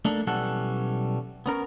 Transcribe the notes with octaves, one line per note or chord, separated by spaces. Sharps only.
A3 A#3 D4 D#4 A4
B1 E3 G3 C#4 A4 F#5
B3 C#4 A#4